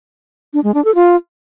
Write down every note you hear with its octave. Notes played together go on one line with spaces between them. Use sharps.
D4
G#3
D4
A4
F4